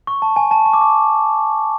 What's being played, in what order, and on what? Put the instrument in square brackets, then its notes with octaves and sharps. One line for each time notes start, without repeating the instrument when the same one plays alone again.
[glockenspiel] C#6
A5
G#5
A5
C#6
D6
C#6